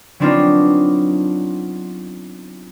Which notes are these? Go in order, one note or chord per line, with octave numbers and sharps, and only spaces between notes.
F#3 B3 C4 D4 D#4 F4